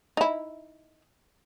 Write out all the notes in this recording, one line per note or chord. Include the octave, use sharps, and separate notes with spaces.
D#4 E4